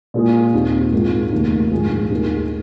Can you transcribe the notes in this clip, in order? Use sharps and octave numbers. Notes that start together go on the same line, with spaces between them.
A#2 G#3 F4 G#4
D#2 D#3 C4
G#1 G#2 G#3 F4
F1 D#2 D#3 A#3
A#1 G#2 G#3 F4 G#4
D#2 D#3 G#3 D#4 G#4